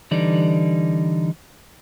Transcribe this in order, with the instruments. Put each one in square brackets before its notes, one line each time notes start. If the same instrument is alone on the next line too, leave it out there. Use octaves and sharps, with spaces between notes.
[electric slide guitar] D3 E3 G3 D#4 D5